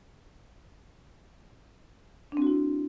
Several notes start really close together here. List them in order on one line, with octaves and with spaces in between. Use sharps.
D4 C4 F#4 E4